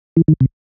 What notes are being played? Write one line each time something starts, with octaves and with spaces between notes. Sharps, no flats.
E3
D#3
C3